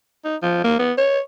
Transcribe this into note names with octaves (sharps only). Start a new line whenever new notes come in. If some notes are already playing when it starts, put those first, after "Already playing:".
D#4
F3
A#3
B3
C#5